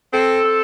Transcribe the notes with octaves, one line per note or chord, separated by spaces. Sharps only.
C4 A4
C4